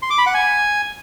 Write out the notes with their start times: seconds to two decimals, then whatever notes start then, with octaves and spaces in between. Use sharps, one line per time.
0.02 C6
0.10 D6
0.18 B5
0.26 F#5
0.34 G#5